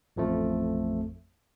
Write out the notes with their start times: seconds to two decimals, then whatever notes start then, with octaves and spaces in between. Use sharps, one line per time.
0.16 A1 F2 F3 A3